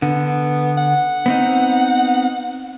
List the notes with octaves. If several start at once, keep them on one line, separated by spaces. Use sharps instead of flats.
D3 B3
F#5
B3 C4 D#4